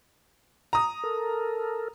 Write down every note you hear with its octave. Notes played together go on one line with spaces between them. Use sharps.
A#5 D#6
A4 A#4